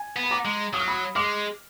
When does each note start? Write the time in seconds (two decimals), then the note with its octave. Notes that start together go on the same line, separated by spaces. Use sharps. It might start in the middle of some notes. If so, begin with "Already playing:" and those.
Already playing: G#5
0.16 B3
0.23 B5
0.31 A#5 D6
0.45 G#3
0.73 F#3 D#6
0.80 F6
0.88 B5 D#6
1.16 G#3 D6 F6